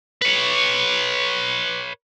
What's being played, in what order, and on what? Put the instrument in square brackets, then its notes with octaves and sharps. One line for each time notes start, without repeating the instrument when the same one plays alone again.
[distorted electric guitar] B4 C#5